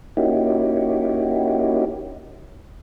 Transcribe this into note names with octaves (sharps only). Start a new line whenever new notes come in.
A#3 C#4 D#4 E4 F#4 G4